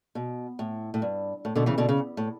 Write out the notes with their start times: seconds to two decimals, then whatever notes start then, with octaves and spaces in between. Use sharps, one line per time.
0.15 B2
0.59 A2
0.94 A2
1.02 G2
1.45 A2
1.55 B2 D3
1.66 C#3 E3
1.78 B2 D3
1.89 C#3
2.17 A2